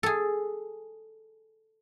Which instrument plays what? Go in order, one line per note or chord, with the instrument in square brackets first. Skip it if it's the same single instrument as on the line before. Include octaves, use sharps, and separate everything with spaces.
[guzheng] G#4 A4